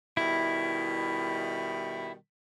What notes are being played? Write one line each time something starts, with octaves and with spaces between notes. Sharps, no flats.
B2 D#3 G3 E4